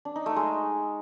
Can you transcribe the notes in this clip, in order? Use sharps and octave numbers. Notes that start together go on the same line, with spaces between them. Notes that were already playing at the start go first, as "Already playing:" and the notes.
D4
D#4
A3
G#3